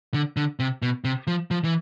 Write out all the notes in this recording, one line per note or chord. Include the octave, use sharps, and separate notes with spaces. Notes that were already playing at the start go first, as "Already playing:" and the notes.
D3
D3
C3
B2
C3
F3
F3
E3